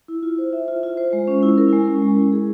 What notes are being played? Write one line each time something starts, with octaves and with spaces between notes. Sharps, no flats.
E4
F4
C5
E5
F4
F4
C5
G#3
C#4
E4
A#4
G#3
C#4
G#3
E4
G#4